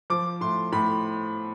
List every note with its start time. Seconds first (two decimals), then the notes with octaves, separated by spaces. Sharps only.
0.10 F3 D6
0.41 A2 C6
0.72 A2 B5